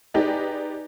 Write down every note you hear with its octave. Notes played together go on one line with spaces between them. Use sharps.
D#4 G4 G#4 B4 D5 D#5